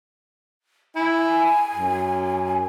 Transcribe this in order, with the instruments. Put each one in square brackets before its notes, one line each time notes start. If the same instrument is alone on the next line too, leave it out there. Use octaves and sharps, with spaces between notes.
[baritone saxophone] E4 [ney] G#5
[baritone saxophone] F#2